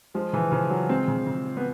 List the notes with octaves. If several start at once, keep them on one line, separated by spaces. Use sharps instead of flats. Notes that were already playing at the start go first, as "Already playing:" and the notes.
F3 G#3
C#3 E3
C#3 F3
F3 F#3
G#3 C4
C#3
C#3
F3
B3